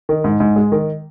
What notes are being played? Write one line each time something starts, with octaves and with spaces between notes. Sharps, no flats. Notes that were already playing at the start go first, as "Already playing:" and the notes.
D#3
G#2
G#2
G#3
D#3